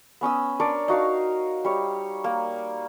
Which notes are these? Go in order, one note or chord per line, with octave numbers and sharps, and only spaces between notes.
B3 C#4 D#6 E6
D4 A#4 C#5 D5
D#4 F#4 F5 A#5
G3 C#5
A#3